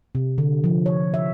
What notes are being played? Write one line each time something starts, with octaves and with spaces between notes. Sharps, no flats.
C3
D3
F3
C#5
E5